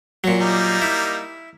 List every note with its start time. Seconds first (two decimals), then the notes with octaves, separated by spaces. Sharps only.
0.24 A#2 F#3
0.40 G3 A#3 D#4
0.82 E4